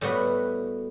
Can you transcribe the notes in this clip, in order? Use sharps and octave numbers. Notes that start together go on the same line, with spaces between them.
A2 G3 B3 F#4